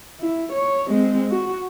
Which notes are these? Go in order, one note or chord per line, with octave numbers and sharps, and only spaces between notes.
E4
C#5
G#3 C4
F#4